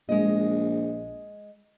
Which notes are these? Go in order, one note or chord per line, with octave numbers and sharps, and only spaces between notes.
A#1 G#3 D#5